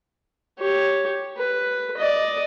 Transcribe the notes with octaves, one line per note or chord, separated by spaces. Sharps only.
G4 C#5
B4
D5 D#5